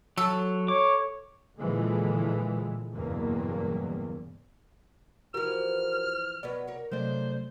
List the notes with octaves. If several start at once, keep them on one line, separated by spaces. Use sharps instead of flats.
F#3 A4
C#5 D6
A#2 D3 E3 F3 G#3
F#1 E2 G2 B2 A#3
E3 F3 F#4 G4 A#4 F6
B2 F#3 B4 D5
A#4 C#5
C3 D#3 F#3 A3 D4 C5